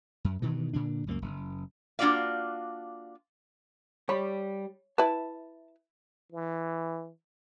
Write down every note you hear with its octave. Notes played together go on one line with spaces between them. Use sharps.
F#2
G2 B2 D#3 E3
A#2 D3 D4
C#2 F#2 G#3 A#3
F#1
A#3 D4 F4 F#4 D5 F5
G3 C#5 B5
E4 B4 A5
E3